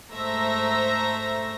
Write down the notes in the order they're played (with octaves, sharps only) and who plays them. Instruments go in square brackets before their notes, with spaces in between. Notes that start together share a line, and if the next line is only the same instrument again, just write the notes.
[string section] G#2 A3 C5 E5 A#5 A#6